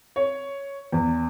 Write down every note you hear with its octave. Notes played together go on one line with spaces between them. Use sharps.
C#5
E2